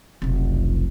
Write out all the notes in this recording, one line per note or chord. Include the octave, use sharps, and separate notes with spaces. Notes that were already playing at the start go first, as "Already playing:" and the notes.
F1 B1